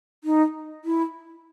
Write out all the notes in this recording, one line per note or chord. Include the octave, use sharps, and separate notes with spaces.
D#4
E4